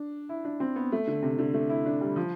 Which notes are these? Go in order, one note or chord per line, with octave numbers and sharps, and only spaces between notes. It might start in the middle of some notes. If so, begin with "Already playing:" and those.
Already playing: D4
E4
D4
C4
B3
A3
D3
C3
D3
A3
E4
D4
G3
F3